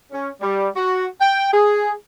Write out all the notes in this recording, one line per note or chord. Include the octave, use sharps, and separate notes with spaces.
C#4
G3
F#4
G5
G#4